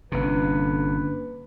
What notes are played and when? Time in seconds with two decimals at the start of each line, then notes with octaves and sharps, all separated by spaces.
0.12 G1 C3 A#3 C#4 D4 B4